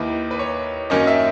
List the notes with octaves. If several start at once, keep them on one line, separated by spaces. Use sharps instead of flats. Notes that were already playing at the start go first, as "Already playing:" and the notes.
Already playing: D#2 D#3 A#3 E4 B4
B4
C#5
F#2 D#3 A#3 C#4 D#5
E5